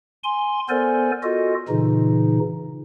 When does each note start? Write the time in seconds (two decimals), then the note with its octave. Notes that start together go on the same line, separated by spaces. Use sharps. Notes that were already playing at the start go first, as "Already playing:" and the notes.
0.24 G#5 C6
0.69 B3 A4 A#4 C5 D5 G#5
1.23 F4 F#4 A4 D#5
1.69 A#2 C#3 E3 D#4